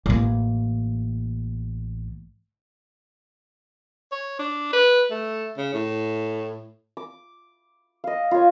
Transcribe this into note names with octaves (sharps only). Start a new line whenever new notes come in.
A1 A#3
C#5
D4
B4
A3
C#3
A2
D6
D#5 F5
F4 C#5